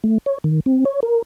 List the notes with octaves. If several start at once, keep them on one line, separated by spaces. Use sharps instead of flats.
A3
C#5
D#3
C4
C#5
A#4